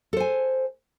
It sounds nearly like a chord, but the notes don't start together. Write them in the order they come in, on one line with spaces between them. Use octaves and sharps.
A4 C5 G#5